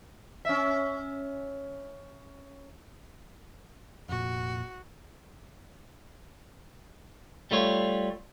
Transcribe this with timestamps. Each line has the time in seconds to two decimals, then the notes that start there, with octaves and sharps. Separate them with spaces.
0.45 C#4 E5
4.09 F1 A#2 F#4
7.51 G3 A3 F4 C#5